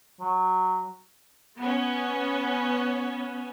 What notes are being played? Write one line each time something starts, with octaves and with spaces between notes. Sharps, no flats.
F#3
B3 C#4